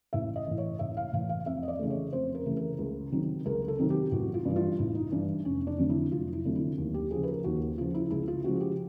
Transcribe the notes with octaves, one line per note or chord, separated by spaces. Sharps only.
A1 E5
D#5
A2 E3
C#5
A1 E5
F5
A2 E3 F5
F5
F2 E5
D#5
D5
C#3 E3 A3
C#5
F2 C5
A#4
C#3 E3 A3
A#4
C#2
C3 D#3 F#3
C#2 A#4
A4
C3 D#3 F#3
G4
A1 F#4
F4
G2 E3
F4
A1 E4
D#4
G2 E3 D4
F1 C#4
C#4
D4
F2 D3 F#3 A3
E4
F1 F4
E4
F2 D3 F#3 A3
E4
D#2
G4
C#3 F3 G#4
B4
A#4
D#2 F#4
C#3 F3 F4
E4
C#2 E4
F4
C#3 F3 G#3 F#4
G4